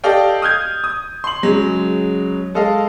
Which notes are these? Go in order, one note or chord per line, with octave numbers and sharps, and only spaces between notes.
G4 A4 D5 D#5 F5 G5
D#6 F6 G6 G#6
D#6
C6 F#7
C#3 F#3 G#3
G#3 A4 D#5 F5